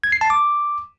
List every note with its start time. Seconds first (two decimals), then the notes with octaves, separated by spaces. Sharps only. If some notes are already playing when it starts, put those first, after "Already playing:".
0.04 G#6
0.12 C7
0.21 A5
0.30 D6